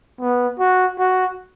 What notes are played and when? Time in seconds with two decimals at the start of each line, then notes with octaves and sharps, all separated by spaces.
0.20 B3
0.59 F#4
0.98 F#4